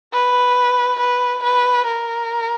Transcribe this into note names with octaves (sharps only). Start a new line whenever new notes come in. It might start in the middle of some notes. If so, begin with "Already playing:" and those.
B4
B4
B4
A#4